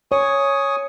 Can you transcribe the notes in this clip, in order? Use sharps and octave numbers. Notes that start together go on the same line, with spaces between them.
C#5 G#5 C#6 D#6